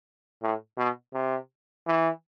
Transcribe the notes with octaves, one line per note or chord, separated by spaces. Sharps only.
A2
B2
C3
E3